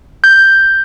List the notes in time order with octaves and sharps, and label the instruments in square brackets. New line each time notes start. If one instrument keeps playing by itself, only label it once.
[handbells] G6